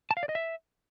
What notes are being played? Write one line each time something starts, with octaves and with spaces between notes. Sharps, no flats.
A5
F5
D5
D#5
E5